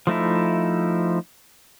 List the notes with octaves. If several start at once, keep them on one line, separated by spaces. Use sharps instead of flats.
F3 A3 D#4 E4